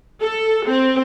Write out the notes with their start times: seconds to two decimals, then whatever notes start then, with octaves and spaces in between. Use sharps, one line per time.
0.21 A4
0.67 C4